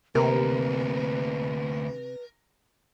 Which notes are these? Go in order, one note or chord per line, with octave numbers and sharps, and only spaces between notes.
D2 C3 A#3 A#4 B4